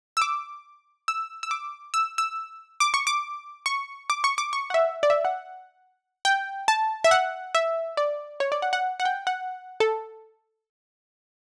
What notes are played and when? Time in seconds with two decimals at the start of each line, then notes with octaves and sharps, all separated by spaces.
0.17 E6
0.22 D6
1.08 E6
1.43 E6
1.51 D6
1.94 E6
2.18 E6
2.80 D6
2.94 C#6
3.07 D6
3.66 C#6
4.10 D6
4.24 C#6
4.38 D6
4.53 C#6
4.70 F#5
4.74 E5
5.03 D5
5.10 E5
5.25 F#5
6.25 G5
6.68 A5
7.04 E5
7.11 F#5
7.55 E5
7.97 D5
8.40 C#5
8.52 D5
8.62 F#5
8.73 F#5
9.00 F#5
9.05 G5
9.27 F#5
9.80 A4